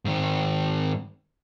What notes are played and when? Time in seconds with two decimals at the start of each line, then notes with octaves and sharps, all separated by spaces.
0.05 G#2 D#3